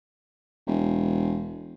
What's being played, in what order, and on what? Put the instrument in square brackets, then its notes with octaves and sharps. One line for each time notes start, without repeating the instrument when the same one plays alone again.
[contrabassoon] E1